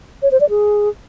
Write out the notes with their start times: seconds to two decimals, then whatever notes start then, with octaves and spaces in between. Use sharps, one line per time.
0.22 C#5
0.32 C5
0.41 D5
0.50 G#4